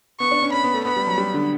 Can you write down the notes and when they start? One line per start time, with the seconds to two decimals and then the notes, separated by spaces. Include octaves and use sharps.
0.20 B3 C#6
0.31 D4
0.42 C#4
0.53 C#4 B5
0.64 B3
0.74 A3
0.85 B3 B5
0.96 G3
1.07 F#3
1.18 G3
1.34 D3